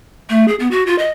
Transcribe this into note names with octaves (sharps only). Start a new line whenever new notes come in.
A3
G#4
B3
F#4
F4
D#5